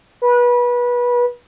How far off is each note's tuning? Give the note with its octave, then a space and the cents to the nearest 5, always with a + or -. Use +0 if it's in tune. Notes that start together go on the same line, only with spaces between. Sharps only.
B4 -25